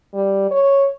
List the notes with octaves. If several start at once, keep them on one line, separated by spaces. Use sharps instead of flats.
G3
C#5